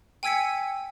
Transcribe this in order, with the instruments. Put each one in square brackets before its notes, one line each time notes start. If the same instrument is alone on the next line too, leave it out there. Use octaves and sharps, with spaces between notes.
[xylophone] G5 G#5 E6 G#6 B6 C#7